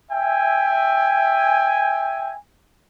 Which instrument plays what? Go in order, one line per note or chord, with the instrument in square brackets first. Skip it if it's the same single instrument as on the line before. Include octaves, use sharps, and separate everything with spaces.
[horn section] E5 G5 G#5